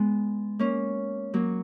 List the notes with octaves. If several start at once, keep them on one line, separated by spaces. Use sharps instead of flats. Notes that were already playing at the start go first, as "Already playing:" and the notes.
Already playing: G#3 B3
A#3 C#4
F#3 A#3